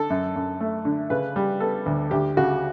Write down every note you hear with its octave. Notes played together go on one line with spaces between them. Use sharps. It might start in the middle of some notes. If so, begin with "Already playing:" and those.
Already playing: D3 A4
F#2
F#2
A3
D3
C#3 B4
G3
B3 A4
D2
D2 G4
C#3 F#4